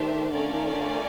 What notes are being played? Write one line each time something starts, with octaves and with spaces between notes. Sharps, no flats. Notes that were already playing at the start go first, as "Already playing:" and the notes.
Already playing: D#3 A3 D4 G4 C5 E5
D3 A3 C#4 F4 A#4 D5
D#3
D3